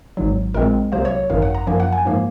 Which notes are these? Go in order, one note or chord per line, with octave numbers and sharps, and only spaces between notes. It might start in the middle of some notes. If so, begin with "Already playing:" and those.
G#1 G#2 F#3
A#1 A#2 G#3 C4 A#4
C2 C3 F#3 A#3 C5
C#5
G#1 F#2 D#3 F#3 F5
F#5
A#5
F#2 F3 A#3 G#5
F#5
G#5
G#2 F3 A#3